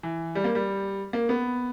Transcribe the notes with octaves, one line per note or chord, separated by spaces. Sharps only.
E3
G3
A#3
G3
A#3
B3